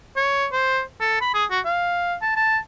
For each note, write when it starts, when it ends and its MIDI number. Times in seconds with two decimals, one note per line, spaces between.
0.16 0.47 73
0.52 0.81 72
1.00 1.20 69
1.21 1.30 83
1.34 1.45 68
1.51 1.60 66
1.65 2.15 77
2.22 2.32 81
2.37 2.58 81